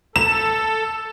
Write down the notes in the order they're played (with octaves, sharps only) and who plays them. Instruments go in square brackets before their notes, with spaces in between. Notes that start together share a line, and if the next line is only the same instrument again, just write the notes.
[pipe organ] A4 [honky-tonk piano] E7